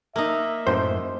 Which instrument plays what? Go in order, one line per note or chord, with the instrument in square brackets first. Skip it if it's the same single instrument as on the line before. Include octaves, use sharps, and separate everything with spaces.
[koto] A#3 D#4 [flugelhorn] E5
[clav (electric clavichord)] F#2 A2 [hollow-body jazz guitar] C5